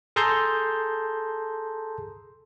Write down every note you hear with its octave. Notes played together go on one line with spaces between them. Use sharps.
G#4 A4 A5 A#5 C6 G6